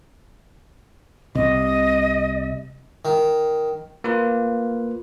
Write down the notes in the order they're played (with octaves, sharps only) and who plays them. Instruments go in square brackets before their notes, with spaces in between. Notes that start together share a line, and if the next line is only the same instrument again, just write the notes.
[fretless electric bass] C2 C3 [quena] D#5
[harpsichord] D#3
[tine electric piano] A#3 F4 B4